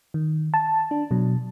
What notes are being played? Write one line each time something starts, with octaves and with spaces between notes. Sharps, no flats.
D#3
A5
D4
B2 F#3